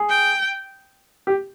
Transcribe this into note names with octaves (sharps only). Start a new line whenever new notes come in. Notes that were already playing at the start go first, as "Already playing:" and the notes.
Already playing: G#4
G5
G4